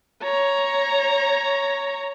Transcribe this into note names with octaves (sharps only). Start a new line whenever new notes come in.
C#5 A#5